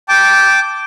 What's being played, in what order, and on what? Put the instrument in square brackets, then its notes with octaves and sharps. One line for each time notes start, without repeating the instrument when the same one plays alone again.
[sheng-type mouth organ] G5 A5 D6